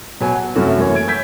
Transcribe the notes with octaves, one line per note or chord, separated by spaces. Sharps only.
B2 F#3 G#5
F#5
F#2 C3 A3 C#4 F#4
E3 A#3 C#5 G#5
G#5 G#6 D7
E6 G6 G#6 B6